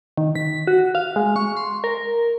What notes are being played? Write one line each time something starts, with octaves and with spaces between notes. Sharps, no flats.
D#3
B6
F#4
F5
G#3
C#6
C6
A#4